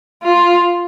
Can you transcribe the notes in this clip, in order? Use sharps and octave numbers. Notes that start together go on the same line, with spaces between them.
F4